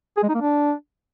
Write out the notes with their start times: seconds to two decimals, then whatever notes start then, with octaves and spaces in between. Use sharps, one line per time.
0.17 G#4
0.23 G#3
0.29 D#4
0.35 A#3
0.41 D4